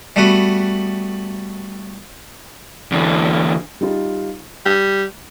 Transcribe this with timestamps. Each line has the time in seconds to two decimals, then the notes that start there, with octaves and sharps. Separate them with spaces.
0.16 G3 A3 B3 F#4 B4
2.92 E2 D3
3.81 G3 D#4 F4
4.66 G3